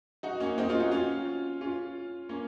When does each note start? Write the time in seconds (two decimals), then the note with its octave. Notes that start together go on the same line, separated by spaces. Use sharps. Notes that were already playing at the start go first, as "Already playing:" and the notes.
0.23 D#4 F#4
0.40 A#3 C#4
0.58 C4 D#4
0.69 C#4 F4
0.80 D#4 F#4
0.92 C#4 F4
1.61 C#4 F4
2.29 A#3 C#4